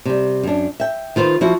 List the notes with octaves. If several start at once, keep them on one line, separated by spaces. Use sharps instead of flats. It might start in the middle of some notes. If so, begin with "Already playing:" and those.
C3 G3
F#2 D4
E5 G5
D#3 F4 B4 C5
F3 E4 F#4